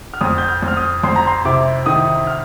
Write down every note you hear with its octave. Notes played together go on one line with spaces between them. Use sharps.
F6
F2 D#6
G6
F6
F2
F6
D#6
F2 C6
A#5
C6
C3 D6
D#3 D#6
F6